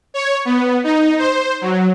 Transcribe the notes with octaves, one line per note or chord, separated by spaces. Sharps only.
C#5
B3
D#4
C5
F#3